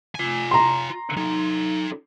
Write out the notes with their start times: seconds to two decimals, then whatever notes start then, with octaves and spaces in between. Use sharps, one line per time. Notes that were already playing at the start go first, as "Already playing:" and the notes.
0.15 F4 G#5
0.51 A#5 C6
1.17 D#4 A4